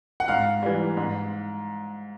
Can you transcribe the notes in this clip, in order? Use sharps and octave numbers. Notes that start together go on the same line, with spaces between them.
F#5
G#2 F5
E3 G3
G#2